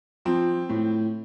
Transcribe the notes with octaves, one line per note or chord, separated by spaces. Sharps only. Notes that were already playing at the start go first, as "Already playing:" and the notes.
F3 C4
A2